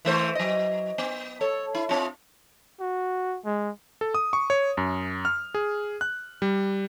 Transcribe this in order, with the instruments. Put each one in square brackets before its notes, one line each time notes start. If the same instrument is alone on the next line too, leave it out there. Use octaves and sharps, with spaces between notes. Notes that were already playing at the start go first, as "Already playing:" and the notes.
[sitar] E3 A3 C5
F#3 D#5
B3
A4 C#5
E4
C4 F4
[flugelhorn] F#4
G#3
[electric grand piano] A4
D#6
C#6
C#5
F#2
F6
G#4
F#6
G3